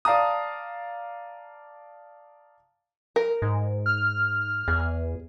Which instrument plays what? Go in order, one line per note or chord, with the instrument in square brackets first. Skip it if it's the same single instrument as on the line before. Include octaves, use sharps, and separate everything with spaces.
[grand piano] D5 F5 A5 A#5 D#6
[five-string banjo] A#4
[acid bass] G#2
[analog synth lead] F6
[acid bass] E2 [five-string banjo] G#4